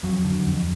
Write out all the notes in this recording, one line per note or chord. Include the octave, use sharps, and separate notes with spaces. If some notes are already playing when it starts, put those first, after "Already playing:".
F2 F#3
D3
F2